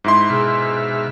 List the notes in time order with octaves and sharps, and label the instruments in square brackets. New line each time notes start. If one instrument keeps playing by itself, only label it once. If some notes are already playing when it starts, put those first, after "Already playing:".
[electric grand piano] G#2 E4 C6
[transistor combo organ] B2 E5 F6 [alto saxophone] G#4